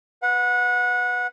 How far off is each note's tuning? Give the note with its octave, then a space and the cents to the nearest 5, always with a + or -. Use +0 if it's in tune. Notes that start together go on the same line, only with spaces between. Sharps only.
B4 +5 F#5 -25